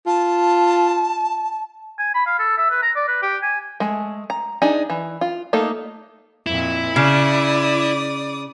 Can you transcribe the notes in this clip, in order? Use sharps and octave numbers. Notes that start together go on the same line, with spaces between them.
F4 A5
G#5
B5
F5
A4
E5
B4
A#5
D5
B4
G4
G#5
G#3 A3
A#5
D4 D#4 G#4
E3
F4
A3 A#3 D#4 A4
F2 A#2 E4
C#3 D5 D#6